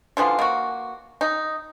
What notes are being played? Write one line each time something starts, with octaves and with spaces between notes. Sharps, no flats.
D3 E3 F3 F4
A#3 F#4
D#4